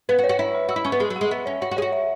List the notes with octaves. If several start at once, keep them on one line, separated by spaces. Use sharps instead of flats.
B3 B4
F#4
C#5
F#4
E4 E5
B5
F#4 E6
E4
C#4 C#6
B3
G#3 B5
F#3
F#5
G#3
B3 E5
C#4 C#5
F#4 C#5
F#4
G#4 C#5
F#4
E5